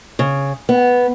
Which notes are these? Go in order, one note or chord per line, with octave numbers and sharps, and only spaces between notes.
C#3
B3